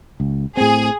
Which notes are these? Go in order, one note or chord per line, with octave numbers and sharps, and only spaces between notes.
C#2
A2 C4 G#4